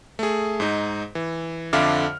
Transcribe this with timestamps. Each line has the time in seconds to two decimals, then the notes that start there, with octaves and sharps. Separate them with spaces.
0.19 A3 G#4
0.60 G#2 D#4
1.15 E3
1.73 F2 D3 E5 F5 D6 F6